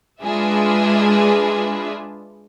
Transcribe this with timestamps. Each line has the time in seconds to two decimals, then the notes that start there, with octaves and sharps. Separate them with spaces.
0.23 G#3 D4 F4 G#4 B4 E5